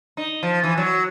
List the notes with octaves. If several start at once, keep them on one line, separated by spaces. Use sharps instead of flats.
D#4
F3
E3
F#3